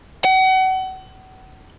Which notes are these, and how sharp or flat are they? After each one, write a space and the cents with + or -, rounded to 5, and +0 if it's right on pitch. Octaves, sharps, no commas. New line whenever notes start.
F#5 +35